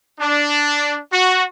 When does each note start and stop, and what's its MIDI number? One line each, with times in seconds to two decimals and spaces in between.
0.20 0.98 62
1.12 1.42 66